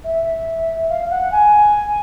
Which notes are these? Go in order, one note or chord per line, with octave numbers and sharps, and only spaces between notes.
E5
F5
F5
F#5
G#5